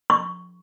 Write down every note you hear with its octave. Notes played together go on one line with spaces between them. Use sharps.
C#6